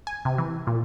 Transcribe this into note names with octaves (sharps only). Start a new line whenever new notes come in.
G#5
C3
E3
A#2